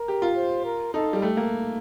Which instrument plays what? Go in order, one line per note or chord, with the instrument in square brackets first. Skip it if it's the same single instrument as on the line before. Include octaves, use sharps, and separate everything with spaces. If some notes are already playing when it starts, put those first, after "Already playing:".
Already playing: [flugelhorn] A#4
[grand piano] G4
F4
[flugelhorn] C5
A#4
[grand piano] D#4 [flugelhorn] A4
[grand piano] G3
[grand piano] A3 [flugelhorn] G4
[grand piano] A#3